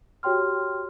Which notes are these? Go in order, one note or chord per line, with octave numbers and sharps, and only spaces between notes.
F#4 G4 C#5 G5 C6 F6